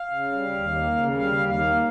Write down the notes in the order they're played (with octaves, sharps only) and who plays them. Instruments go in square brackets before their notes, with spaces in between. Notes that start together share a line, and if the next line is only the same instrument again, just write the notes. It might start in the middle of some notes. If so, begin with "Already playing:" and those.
Already playing: [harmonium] F5
C#3
G3
D#2
A#3
C#3
G3 F5
D#2
F5
A#3